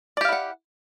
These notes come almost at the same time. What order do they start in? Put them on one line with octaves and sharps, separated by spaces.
D5 G4 F5 E4 F#5